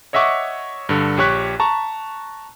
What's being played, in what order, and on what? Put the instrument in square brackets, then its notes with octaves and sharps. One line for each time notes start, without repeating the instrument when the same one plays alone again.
[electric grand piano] C#5 D#5 E5 F#5 C#6 D6
G2 D3
A#1 G4 C#5 C#6 F#6 B6
A5 A#5 C#6